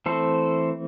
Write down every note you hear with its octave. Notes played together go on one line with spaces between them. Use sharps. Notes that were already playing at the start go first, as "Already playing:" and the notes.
E3 A3 C4 A4 C5